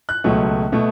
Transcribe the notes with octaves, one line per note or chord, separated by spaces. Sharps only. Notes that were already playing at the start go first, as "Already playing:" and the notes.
F#6
C#2 B2 F#3 A3
B2 A3